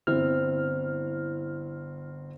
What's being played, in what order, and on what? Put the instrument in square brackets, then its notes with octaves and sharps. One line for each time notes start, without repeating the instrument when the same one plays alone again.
[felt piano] G1 C4 [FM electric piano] E4 F6